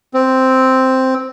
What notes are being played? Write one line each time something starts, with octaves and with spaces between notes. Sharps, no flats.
C4